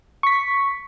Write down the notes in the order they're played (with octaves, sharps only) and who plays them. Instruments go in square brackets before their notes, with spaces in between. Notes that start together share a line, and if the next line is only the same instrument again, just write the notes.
[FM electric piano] C#6 B6